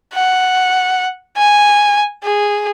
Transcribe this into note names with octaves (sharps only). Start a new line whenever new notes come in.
F#5
G#5
G#4